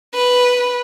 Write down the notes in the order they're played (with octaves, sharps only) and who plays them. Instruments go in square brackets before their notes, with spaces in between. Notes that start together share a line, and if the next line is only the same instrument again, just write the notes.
[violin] B4